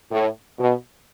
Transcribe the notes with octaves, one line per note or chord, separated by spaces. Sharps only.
A2
B2